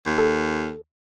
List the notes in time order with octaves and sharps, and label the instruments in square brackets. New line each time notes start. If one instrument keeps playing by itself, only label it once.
[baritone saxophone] D#2
[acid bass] A4